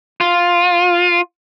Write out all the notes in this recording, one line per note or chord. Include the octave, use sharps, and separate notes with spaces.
F4